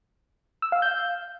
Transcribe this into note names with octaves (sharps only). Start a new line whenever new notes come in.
E6
F5
G6